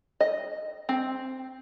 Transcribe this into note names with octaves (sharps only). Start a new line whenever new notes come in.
D#5
C4